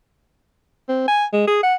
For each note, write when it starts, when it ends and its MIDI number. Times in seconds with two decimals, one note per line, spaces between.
0.89 1.06 60
1.08 1.25 80
1.33 1.44 56
1.47 1.62 68
1.63 1.75 78